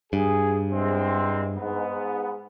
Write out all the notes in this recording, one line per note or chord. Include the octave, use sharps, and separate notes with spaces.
G2 G#4
E2 G#3 C4
G#2 B3